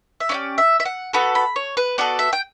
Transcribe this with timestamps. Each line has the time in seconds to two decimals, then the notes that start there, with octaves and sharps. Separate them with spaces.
0.20 E5
0.29 C#4 E4 D5
0.34 G4
0.58 E5
0.80 E5
0.85 F#5
1.13 B3 F#4 A4 B5
1.35 B5
1.56 C#5
1.77 B4
1.98 B3 F#4 A4 D5
2.19 E5
2.33 G5